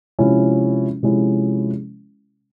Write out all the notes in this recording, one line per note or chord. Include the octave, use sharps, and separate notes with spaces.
C3 F3 G#3 C#4 E4
C3 F3 G#3 C#4 E4